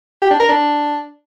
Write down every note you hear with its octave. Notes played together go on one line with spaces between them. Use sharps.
G4
D4
A#4
D4